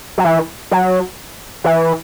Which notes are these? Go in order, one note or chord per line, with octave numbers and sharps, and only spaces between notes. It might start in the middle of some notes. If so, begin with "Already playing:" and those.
F#3
E3
F#3
E3